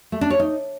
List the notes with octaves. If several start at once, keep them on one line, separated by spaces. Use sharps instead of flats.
A3
D4
C#5
D#4